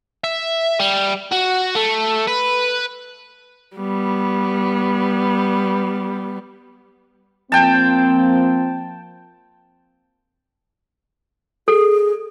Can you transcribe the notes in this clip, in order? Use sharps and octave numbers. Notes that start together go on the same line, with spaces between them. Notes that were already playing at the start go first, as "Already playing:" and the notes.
E5
G3
F#4
A3
B4
G3 B3
F3 A#3 C4 G5 A5
G#4 A4